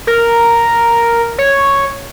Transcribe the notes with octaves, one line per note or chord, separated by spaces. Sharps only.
A#4
C#5